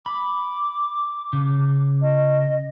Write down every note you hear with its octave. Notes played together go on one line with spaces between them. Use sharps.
B5 D6
C#3
D#5